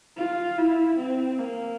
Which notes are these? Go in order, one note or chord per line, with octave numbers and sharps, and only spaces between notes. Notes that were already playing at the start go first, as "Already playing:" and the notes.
F4
E4
C4
A#3